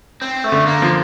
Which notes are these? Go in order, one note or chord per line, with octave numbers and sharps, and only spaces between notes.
C4
A3
D3
A#3
F3